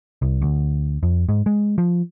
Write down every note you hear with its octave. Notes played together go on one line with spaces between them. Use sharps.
C2
D2
F2
G#2
G#3
F3